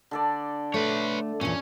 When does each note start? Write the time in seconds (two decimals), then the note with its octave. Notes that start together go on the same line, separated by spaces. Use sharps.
0.11 D3 A4 D5
0.74 A3 B4 C#5
1.41 E2 A#2 C#4